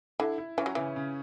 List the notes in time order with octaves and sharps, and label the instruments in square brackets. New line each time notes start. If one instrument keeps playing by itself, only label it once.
[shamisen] D3 [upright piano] E4
[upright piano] E4
[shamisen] E3 [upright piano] C#4
[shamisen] F#3
[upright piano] C#3 [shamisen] E3
[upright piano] C#3